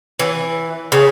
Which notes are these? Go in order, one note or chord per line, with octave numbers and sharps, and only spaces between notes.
E3
C#3